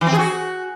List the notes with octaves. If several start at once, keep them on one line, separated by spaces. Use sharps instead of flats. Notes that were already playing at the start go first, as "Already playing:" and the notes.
E3
C4
G#4
F#4